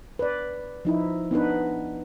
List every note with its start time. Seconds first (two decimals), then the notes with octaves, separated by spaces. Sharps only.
0.19 B4 D5
0.85 F3 D#4 E4
1.31 B3 D4 D#4 B4